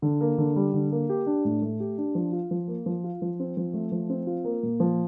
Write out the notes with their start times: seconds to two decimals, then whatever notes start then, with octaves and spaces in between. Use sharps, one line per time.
0.02 D3
0.21 A#3
0.38 D3
0.56 G3
0.74 D3
0.91 A#3
1.09 G4
1.27 D4
1.45 A2
1.62 A3
1.80 G4
1.98 D4
2.15 F3
2.32 F4
2.51 F3
2.68 A#3
2.86 F3
3.04 F4
3.22 F3
3.40 C4
3.57 F3
3.74 A3
3.92 F3
4.10 C4
4.27 F4
4.44 A#3
4.63 A#2
4.80 F3